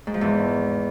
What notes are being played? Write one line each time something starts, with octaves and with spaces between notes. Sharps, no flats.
G#2
F3
E2